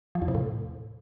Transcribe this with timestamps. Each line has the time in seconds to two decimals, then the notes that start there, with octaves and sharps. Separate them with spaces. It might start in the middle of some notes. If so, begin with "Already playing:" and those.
0.15 F3
0.22 E2
0.28 C3
0.35 A2